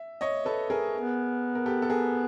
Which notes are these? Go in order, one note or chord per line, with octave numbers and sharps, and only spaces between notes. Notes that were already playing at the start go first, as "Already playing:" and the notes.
Already playing: E5
C#5 D#5
A4 B4
G#4 A#4
B3
A#4
G4 A4
A4
G#4 A#4